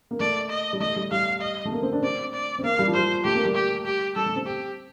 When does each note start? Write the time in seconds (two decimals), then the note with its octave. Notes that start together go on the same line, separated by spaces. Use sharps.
0.11 A#3
0.19 A3 D5
0.50 D#5
0.73 G3
0.80 A3 D#5
0.96 G3
1.11 G3 F5
1.41 D#5
1.65 A3
1.72 A#3
1.82 C4
1.93 D4
2.02 C4 D5
2.34 D5
2.59 C4
2.63 A#3 F5
2.79 G3
2.87 F3
2.94 G3 C5
3.24 A3 G4
3.35 A#3
3.45 G3
3.55 G4
3.86 G4
4.16 G3 A4
4.26 A3
4.36 C4
4.46 G4